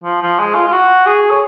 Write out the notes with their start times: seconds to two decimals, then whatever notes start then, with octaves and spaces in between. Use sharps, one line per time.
0.04 F3
0.22 F3
0.39 G#3
0.55 F4
0.68 F4
0.72 F#4
1.06 G#4
1.31 C#5